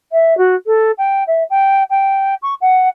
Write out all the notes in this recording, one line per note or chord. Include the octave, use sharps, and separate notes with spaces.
E5
F#4
A4
G5
E5
G5
G5
C#6
F#5